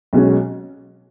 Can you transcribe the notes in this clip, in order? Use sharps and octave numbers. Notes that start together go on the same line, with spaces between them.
B1 B2 G#3 C#4